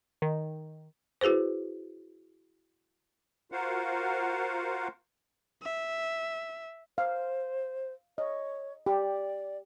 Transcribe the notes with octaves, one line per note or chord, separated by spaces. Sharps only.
D#3
E4 F#4 G#4 B4 C5
F4 F#4 A#4 C5 F5 F#5
E5
C5 F5
C#5 D#5
G4 D5